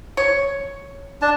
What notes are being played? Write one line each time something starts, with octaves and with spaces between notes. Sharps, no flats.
C#5
D4 A5